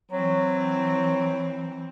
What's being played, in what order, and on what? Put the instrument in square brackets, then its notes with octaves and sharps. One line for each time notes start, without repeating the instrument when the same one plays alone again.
[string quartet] E3 C4 [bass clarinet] F#3